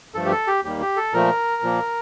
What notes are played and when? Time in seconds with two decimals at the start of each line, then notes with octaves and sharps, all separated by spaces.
0.14 G2 F3 A3 A4
0.25 G4
0.31 A4
0.47 G4
0.64 D#2 D#3 G3 A#3 G4
0.81 G4
0.96 A4
1.13 A#2 F3 A3 A#4
1.62 A#2 F3 A#3